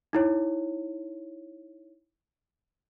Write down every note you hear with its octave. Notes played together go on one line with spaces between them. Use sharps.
D#4 E4 C#5